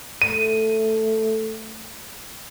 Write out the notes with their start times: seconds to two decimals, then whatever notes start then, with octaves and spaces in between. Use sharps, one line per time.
0.22 A3 D#7